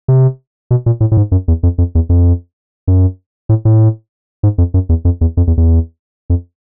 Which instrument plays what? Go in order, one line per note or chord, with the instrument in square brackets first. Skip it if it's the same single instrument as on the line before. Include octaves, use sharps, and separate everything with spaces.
[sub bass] C3
B2
A#2
A2
A2
G#2
F#2
E2
F2
F2
E2
F2
F#2
A2
A2
G#2
F2
F#2
E2
F2
E2
F2
E2
E2
F2